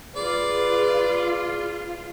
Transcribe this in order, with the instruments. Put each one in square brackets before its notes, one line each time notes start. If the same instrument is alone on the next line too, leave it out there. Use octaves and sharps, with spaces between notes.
[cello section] F4 [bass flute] G#4 [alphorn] B4 [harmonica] D5